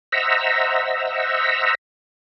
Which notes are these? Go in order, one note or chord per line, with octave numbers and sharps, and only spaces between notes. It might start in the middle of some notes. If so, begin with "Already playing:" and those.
C5 D#5 E5 F#5 A#5 E6